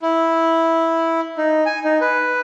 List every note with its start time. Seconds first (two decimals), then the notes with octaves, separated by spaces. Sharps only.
0.02 E4
1.38 D#4
1.66 G#5
1.84 D#4
2.01 B4